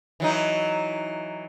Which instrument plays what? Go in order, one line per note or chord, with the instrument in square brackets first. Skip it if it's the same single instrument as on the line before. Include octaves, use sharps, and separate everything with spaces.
[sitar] E3 F#3 D#4